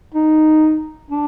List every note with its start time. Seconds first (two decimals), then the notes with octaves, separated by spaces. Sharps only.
0.14 D#4
1.10 D4